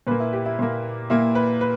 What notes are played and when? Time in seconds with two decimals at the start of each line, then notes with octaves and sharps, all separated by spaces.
0.07 A#2 A#3 B4
0.20 E4
0.33 G4
0.46 E4
0.59 A#2 A#3
1.10 A#2 A#3 E4
1.35 B4
1.61 B4